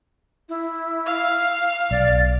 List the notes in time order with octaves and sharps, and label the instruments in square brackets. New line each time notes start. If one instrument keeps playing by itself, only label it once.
[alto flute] E4
[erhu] F5
[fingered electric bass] B1 [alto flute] D5